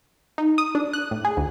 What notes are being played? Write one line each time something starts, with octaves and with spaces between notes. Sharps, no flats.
D#4
D#6
D4
F#6
A2
G#4
D2